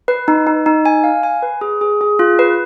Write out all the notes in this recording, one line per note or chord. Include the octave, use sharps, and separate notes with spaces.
B4
D#4
D#4
D#4
G#5
F5
G#5
B4
G#4
G#4
G#4
F4
B4